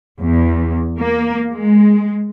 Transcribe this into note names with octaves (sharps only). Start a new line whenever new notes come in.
E2
A#3
G#3